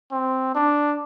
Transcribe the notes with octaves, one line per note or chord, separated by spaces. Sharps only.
C4
D4